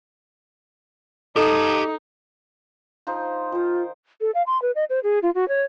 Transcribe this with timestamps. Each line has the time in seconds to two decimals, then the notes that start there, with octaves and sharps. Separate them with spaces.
1.36 D#4 G4 A4 A5
3.07 F3 D#4 C5
3.52 D#3 F4 C5
4.21 A4
4.34 F5
4.46 C6
4.62 B4
4.75 D#5
4.90 C5
5.03 G#4
5.22 F4
5.35 F#4
5.48 C#5